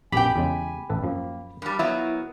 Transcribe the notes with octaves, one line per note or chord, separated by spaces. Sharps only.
A#1 F#2 B2 G4 G5 G#5 B5
E2 C#3 G#3
A1 A4 B4
F#2 F3 A#3
G2 G3 A#4
F#3 B3 E4 F4